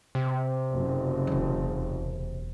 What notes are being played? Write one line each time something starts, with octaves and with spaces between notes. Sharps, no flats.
C3
F#1
E1 E2